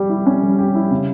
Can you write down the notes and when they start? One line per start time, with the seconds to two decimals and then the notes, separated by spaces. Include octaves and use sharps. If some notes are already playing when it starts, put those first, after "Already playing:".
Already playing: G3 G4
0.10 E4
0.26 C#4
0.43 G3
0.59 G4
0.75 E4
0.91 C#3